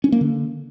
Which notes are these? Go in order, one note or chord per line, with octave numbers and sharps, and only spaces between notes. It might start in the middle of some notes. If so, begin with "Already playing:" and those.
C#4
A#3
D3